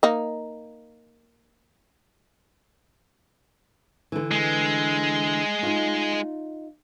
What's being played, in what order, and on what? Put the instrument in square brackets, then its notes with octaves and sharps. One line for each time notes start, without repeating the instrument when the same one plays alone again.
[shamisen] A#3 D#4
[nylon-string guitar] D3 E3
[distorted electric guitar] G#3
[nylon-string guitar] D#4 F4